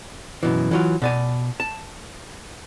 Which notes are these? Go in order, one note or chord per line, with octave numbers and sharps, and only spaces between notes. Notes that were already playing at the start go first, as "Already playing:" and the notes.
F#2 B2 E3
E3 F#3 F4
B2 D5 G#5
A5